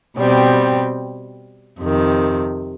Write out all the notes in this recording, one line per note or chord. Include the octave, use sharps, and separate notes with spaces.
B2 G3 C4
F2 C3 D#3